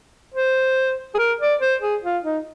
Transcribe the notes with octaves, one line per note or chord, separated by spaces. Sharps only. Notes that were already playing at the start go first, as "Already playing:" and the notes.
C5
G#4
A#4
D5
C5
G#4
F4
D#4